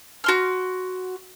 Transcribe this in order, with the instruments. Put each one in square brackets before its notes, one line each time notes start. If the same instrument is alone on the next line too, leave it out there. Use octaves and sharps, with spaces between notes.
[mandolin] F#4 C6 F6